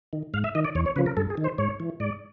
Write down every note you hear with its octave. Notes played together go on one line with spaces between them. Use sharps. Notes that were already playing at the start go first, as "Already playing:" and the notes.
D#3
G#2 F5
E5
D#3 D#5
D5
E2 C#5
C#5
C#3 F3 B4
A#4
G2 A4
G#4
D#3
C5
G#2 C#5
E3
G#2 D5